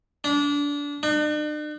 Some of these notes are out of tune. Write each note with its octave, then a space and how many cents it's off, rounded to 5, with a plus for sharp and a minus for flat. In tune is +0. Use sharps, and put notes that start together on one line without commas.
D4 -25
D4 +45